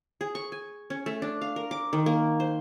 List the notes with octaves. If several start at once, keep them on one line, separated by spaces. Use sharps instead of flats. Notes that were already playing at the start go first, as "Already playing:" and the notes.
G#4
C#6
G#5
C#4
A3
D4
F5
A#4
D6
D#3
A#3
C5